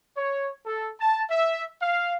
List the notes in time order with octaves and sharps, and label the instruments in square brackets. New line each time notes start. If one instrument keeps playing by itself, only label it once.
[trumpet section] C#5
A4
A5
E5
F5